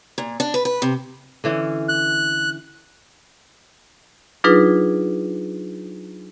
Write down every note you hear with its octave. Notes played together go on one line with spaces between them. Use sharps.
A#2
D4
B4
B4
C3
D3 E3 C#4
F#6
F#3 D4 D#4 F4 G#4 B4